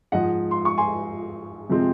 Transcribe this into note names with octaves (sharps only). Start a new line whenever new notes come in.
G#2 F3 G#3 D#5 F#5
C6
C#6
G#5 C6
C3 F3 G#3 C4